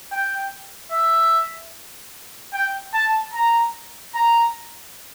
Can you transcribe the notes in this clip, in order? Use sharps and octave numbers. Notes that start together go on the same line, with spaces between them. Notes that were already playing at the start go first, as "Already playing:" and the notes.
G5
E5
G5
A5
A#5
A#5